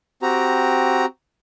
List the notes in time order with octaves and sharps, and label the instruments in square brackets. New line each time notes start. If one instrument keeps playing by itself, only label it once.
[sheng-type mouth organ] C4 F#4 G4 A#5